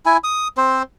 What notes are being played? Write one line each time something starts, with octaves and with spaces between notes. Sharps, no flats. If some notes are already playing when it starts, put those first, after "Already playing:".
E4 G#5
D#6
C4 C5